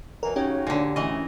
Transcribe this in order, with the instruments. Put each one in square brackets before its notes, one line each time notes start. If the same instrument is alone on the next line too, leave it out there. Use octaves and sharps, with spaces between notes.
[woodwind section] F#2 B2 E3 [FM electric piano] A#4
[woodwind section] C#3 F#3 D#4 [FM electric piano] C#4 G4
[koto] A#2 D3
[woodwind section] F#2 A3 [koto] E3 D#5